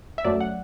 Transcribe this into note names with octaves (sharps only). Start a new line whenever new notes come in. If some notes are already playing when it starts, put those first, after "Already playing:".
E5
F#2 F#3 A3 D5
F#5